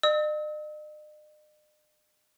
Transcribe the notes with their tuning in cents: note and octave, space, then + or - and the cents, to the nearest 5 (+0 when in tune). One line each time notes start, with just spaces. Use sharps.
D#5 -45 E6 -45